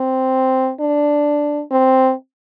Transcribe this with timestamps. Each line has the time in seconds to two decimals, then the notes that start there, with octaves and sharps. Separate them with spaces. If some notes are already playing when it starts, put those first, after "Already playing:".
Already playing: C4
0.80 D4
1.71 C4